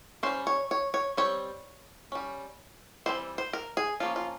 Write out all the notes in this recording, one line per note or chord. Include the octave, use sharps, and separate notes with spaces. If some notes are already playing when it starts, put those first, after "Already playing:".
G3 C#4 C5
C#5
C#5
C#5
G3 C4 C#5
G3 C#4
E3 G3 C4 C5
C5
A#4
G#4
F3 A#3 C#4 F4
F4